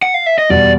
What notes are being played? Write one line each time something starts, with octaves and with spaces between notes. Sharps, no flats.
F#5
F5
E5
D#5
E2 B2 G3 D5